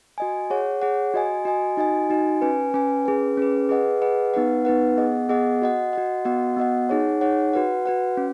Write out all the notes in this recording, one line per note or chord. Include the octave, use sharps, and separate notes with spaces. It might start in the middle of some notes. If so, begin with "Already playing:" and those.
F#4 D#5 G#5
G#4 C#5 F#5
G#4 C#5 F#5
F#4 D#5 G#5
F#4 D#5 G#5
D#4 F#4 D#5 G#5
D#4 F#4 D#5 G#5
C#4 B4 G#5
C#4 B4 G#5
C#4 G#4 B4
C#4 G#4 B4
G#4 B4 D#5 F#5
G#4 B4 D#5 F#5
B3 D#4 B4 F#5
B3 D#4 B4 F#5
B3 G#4 D#5 F#5
B3 G#4 D#5 F#5
F#4 D#5 F#5
F#4 D#5 F#5
B3 F#4 D#5 F#5
B3 F#4 D#5 F#5
D#4 G#4 C#5 F#5
D#4 G#4 C#5 F#5
F#4 B4 F#5
F#4 B4 F#5
C#4